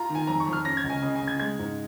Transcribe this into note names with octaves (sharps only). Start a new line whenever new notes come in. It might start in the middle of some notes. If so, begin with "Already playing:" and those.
Already playing: F4 A#5
D#3
G#5
F2 A#5
C#6
F2
F6
C#4 A#6
G#6
C#2
G#5
C#3 D#5
G#5
C#3
G#6
G#3 G#6
G#2